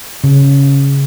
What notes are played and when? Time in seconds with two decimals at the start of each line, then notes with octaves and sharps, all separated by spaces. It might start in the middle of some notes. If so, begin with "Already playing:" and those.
0.24 C#3